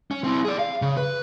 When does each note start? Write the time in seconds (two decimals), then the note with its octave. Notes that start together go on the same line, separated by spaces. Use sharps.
0.11 C#4
0.24 C4 E4
0.45 G#4 D5
0.59 F5
0.82 C#3
0.97 B4